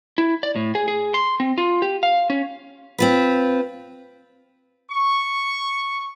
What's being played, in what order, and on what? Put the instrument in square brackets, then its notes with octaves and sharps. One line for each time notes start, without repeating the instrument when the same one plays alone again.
[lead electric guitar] E4
D5
A2
G#4
G#4
C6
C4
F4
G4
F5
C#4
[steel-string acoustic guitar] C4 F4 B4
[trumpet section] C#6